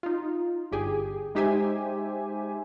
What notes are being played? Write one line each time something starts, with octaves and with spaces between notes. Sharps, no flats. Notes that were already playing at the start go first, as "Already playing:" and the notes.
D#4 F4
G1 G4 G#4
G#3 D#4 G4 C5 E5 G#5